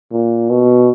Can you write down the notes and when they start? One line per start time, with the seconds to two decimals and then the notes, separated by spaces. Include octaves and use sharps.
0.12 A#2
0.50 B2